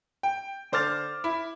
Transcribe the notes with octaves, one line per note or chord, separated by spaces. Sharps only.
G5
D3 C5 D6 F6 A6
E4